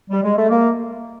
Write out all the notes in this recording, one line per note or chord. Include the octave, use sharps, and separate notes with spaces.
G3
G#3
A3
A#3